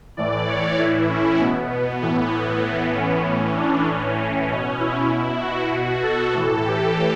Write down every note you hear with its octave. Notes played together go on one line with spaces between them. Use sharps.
A2 E3 D5
C#5
A2 E3 E4
C#4
B2 B3
B3
A2 E3 B3
A2 E3
C#4
A2 E3 C#4
D4
A2 E3 C#4
C#4
B2
E4
B2
F#4
B2
A4
A2 E3 A4
G4